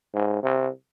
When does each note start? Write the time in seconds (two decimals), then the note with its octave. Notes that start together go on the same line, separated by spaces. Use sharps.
0.14 G#2
0.43 C3